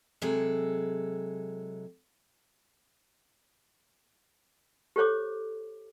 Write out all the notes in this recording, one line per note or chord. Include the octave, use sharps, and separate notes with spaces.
C3 F#3 G#3 G#4 A4
G4 A4 C5 C#5 D6